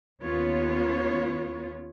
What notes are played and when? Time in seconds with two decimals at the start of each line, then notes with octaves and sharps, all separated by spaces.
0.22 D#2 B3 C#4 F4 C#5